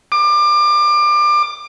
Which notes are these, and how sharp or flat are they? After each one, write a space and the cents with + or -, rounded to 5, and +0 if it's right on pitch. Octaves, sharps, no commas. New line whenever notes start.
D6 +25